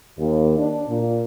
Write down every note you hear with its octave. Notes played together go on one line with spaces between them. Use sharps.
D#2
D4
A#2